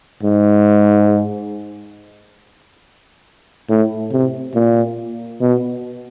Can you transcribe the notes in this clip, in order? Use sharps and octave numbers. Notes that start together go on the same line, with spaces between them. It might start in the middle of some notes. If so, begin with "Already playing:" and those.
G#2
A2
C3
A#2
B2